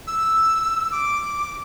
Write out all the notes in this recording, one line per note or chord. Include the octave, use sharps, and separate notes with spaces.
E6
D6